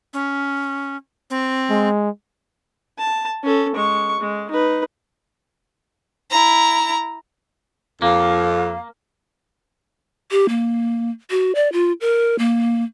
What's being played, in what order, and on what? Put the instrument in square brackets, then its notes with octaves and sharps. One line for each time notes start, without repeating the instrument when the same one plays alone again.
[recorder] C#4
C4
[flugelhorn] G#3
[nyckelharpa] A5
C#4 A4
G#3 C#6
G#3
D#4 B4
[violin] E4 A#5
[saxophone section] F2 [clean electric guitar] A#3 [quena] F5
[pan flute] G4
A#3
F#4
D5
F4
A#4
A#3